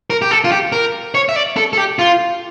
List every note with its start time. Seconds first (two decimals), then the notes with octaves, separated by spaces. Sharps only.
0.10 A#4
0.22 G4
0.31 A4
0.44 F4
0.52 G4
0.72 A#4
1.15 C#5
1.29 E5
1.36 D5
1.57 A4
1.73 A4
1.77 G4
1.99 F4